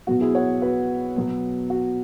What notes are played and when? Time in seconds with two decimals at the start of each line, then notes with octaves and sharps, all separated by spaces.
0.07 B2 F#3 B3 F#4
0.21 E4 G#4
0.35 C#5 F#5
0.62 F#4 B4
1.16 B2 F#3 B3
1.70 F#4